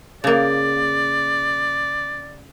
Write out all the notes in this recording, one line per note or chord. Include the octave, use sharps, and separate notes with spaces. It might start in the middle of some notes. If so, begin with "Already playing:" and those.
C#3 A#3 D5